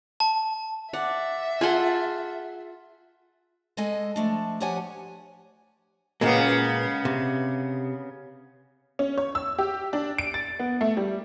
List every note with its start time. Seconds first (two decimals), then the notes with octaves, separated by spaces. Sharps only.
0.20 A5
0.93 D5 E5 F#5
1.61 F4 G#4 A4 F#5 C6
3.77 G#3 A4 D#5 G#5
4.16 F3 A3 D4
4.60 F3 G4 C#5 F#5 G#5
6.21 A#2 C#3 G#3 A#3 B3
7.05 C3
8.99 C#4
9.18 C#5
9.35 E6
9.58 G4
9.93 D4
10.18 D7
10.34 A6
10.59 B3
10.81 A3
10.97 G3